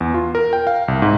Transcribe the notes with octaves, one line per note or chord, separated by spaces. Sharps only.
E2
F4
A#4
G5
F5
C2
G#2